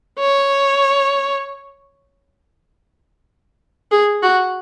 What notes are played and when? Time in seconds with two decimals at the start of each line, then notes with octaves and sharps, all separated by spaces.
0.19 C#5
3.91 G#4
4.22 F#4